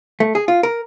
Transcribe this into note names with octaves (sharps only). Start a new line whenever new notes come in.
A3
G#4
F4
A#4